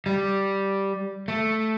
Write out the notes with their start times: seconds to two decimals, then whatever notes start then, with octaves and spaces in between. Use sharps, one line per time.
0.06 G3
1.28 A3